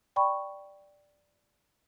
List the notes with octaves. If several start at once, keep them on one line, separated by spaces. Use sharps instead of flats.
D5 G5 B5 C#6